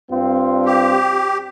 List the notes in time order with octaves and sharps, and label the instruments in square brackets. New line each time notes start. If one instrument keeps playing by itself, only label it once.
[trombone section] G2 C4 F4
[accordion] G4